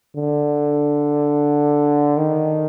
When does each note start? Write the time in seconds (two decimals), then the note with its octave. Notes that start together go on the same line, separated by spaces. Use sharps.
0.16 D3
2.17 D#3